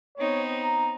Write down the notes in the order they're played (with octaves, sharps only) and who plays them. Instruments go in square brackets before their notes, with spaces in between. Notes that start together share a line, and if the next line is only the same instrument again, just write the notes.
[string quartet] B3 C4 D#4 [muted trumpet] C#5
[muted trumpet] A#5